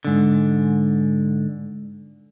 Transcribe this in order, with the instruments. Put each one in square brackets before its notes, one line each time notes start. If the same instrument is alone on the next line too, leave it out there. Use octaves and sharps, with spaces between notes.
[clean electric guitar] G#2 D3